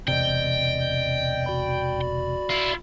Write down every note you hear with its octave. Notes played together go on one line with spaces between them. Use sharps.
E1 C3 D5 D#5 G5
F#4 D5 B5
E4 F4